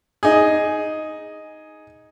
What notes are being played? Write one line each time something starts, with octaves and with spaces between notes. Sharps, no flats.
D#4 G#4